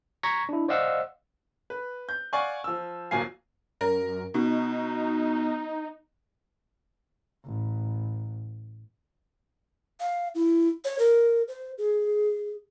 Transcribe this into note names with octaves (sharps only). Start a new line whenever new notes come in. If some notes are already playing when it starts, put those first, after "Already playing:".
A#5 C#6 G#6 A#6 B6
D4 E4
C5 D5 D#5 F5 F#5 E6
B4
G6
D5 F5 F#5 G#5 C#6
F3 E6
D1 A#2 F#3 F5 G#5 C7
F#2 A#4
B2 D#4
A1
F5
E4
C#5
A#4
C5
G#4